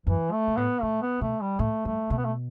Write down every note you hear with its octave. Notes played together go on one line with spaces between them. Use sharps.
F#2 E3
A3
B2
A2 B3
A2 A3
B3
B2 A3
G3
A2 A3
G2 A3
B2 A3
B3
A3